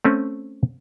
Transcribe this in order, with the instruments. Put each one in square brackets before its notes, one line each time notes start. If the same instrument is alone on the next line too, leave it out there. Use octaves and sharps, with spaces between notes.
[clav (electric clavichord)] A3 C4 C#4